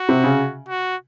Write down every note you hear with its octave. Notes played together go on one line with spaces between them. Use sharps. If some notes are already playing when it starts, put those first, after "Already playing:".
Already playing: F#4
C3
C#3
F#4